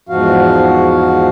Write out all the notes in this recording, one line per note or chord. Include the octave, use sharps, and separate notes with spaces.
E2 G#2 F3 F#4 F5